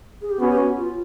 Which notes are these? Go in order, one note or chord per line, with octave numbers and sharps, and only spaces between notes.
G#4
G4
B3 C#4 F#4
G4
F#4
F4